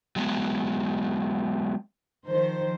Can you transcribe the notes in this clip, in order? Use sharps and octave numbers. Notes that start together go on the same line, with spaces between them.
F#3 G#3 B3
D#3 F3 C5